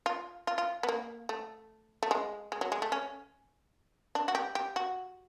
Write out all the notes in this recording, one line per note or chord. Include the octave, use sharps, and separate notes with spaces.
F4
F4
F4
B3
A#3
A3
A3
G#3
G#3
F#3
G#3
A3
C#4
D4
F#4
G4
G4
F#4